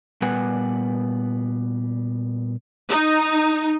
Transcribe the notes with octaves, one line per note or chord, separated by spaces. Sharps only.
A#2 G3 B3 B4 F#5 G#5
D#4